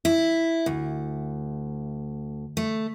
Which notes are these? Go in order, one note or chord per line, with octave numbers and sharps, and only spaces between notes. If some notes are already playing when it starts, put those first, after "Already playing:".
E4
D2
A3